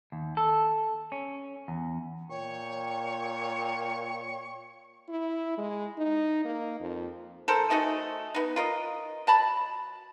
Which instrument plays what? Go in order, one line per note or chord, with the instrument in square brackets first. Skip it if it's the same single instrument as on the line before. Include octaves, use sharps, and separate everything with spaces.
[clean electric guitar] D#2
A4
C#4
E2
[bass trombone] A#2 [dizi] C#5 [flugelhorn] G5 [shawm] C#6
[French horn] E4
G#3
D#4
A#3
F2
[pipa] A4 A#4 C5
A3 D#4 F#4 G#4
B3 D#4
F4 A#4 D#5
F#3 A5 B5